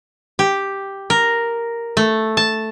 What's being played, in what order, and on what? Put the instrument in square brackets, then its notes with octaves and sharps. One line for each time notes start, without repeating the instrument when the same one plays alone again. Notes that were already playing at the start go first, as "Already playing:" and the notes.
[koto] G4
A#4
A3
A5